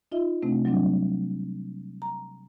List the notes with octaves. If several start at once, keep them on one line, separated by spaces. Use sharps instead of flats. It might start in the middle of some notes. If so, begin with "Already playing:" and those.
D#4 F4 D#5 E5
C3 A3 C4 D4
F#3 G3 C4 D4
A#5